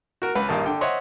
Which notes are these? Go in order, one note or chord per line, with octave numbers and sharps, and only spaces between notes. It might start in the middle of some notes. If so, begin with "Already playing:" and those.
F#4 A#4
C#2 B4
A#1 G2 D#3 A#3 A5
D3 G5
C5 C#5 D#5 E5 F#5